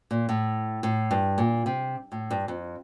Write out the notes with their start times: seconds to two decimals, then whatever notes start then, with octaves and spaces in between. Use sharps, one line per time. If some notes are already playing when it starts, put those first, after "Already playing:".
0.11 A#2
0.29 A2
0.83 A2
1.11 G2
1.38 A#2
1.66 C3
2.12 A2
2.31 G2
2.48 F2